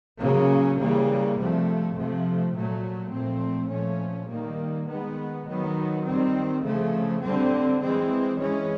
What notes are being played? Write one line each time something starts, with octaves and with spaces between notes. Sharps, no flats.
C#3 F#3 A#3 C#4
C#3 E3 G3 A#3
C3 F3 A3
C3 F3 A3
A#2 F#3 A3
A#2 F3 A3 C4
A#2 F3 A3 C#4
D#3 G3 A#3
D#3 G#3 B3
D#3 F#3 B3
D#3 G3 C4
C#3 F3 A3
D3 G3 C4
E3 G#3 C4
E3 G#3 C#4